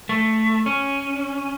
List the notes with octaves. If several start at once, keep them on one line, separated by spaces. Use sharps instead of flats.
A3
C#4